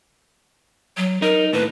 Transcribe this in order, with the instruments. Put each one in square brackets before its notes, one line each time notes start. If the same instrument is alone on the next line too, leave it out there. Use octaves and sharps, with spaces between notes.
[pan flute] F#3
[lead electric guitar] D#4 [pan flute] A#4
[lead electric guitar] D#2 A2 [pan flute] B4